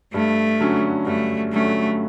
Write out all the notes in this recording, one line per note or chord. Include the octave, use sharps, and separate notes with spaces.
G2 A3
D3 F#3 C#4
G2 A3
D3 F#3 A3 C#4